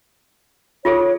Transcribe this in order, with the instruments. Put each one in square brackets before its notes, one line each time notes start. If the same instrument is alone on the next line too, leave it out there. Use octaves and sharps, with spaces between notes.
[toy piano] F4 G#4 A4 [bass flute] C#5